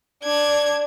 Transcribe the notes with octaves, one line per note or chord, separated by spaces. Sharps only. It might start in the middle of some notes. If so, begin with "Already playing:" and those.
D4 G#6